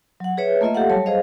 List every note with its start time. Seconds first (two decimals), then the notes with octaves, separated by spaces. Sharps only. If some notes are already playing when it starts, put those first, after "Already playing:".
0.20 F#3 F#5
0.37 G#4 B4 C#5 E5
0.61 A3 A#3 F4 D#5 E5
0.75 G4 A4 F5 F#5
0.90 F#3 G3 C#5 A5
1.06 G#4 C5 D#5 F5